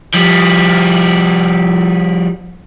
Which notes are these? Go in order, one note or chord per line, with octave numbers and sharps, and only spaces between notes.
F3 G3